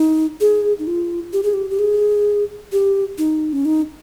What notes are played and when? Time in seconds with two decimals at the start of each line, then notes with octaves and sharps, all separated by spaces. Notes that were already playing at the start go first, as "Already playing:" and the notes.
Already playing: D#4
0.41 G#4
0.79 D#4
0.87 F4
1.33 G4
1.43 G#4
1.54 G4
1.70 G4
1.79 G#4
2.72 G4
3.18 D#4
3.53 C#4
3.65 D#4